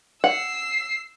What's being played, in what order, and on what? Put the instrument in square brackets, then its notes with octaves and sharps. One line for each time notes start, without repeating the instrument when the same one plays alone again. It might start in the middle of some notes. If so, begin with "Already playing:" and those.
[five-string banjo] F#5 [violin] E6 C7